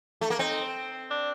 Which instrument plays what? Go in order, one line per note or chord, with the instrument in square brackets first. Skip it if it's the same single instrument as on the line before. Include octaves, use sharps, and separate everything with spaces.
[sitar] A3
A#3
[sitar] C4 [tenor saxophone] D#4
[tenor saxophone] D4